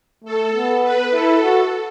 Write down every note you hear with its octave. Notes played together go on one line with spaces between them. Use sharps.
A3 A4
B3
B4
E4 A4
F#4